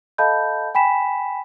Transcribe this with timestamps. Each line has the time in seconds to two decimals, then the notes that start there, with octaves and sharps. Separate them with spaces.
0.18 A4 D#5 F5 A5 B5 G6
0.75 G5 G#5 B5 B6 E7